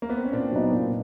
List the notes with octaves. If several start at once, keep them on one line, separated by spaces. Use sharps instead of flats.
A#3
B3
C4
C#4
A#2 C4 D4
F#3 B3 D#4
A#2